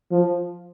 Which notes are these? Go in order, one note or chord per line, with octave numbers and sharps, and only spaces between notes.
F3